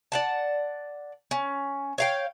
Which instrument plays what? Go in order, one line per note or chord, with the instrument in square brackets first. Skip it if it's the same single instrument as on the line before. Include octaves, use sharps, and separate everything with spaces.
[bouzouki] D5 F#5 A5
C#4
C#5 F5 G5